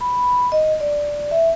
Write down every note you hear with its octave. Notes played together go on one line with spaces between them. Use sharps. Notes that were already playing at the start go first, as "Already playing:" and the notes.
B5
D#5
D5
E5